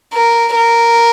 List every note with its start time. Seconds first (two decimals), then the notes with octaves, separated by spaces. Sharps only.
0.14 A#4
0.55 A#4